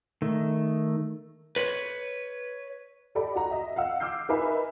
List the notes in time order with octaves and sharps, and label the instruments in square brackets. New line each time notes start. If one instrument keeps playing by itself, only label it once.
[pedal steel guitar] D#3 A3
[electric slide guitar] B4 C#5
[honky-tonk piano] G4 A4 D5 D#5 B5
F#4 A#5
D#5 E5
F5 F#5 E6
D6 E6 F6 G6 C7
D#4 A#4 B4 E5 G#5 B5